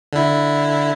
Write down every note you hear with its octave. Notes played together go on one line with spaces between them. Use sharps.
D3 E4